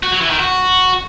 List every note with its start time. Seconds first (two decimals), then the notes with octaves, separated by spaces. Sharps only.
0.03 F#4
0.12 F#3
0.21 E3
0.31 D#3
0.40 F#4